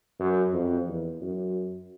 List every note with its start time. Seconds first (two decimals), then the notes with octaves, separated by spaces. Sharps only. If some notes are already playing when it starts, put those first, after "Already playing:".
0.20 F#2
0.53 F2
0.87 E2
1.21 F#2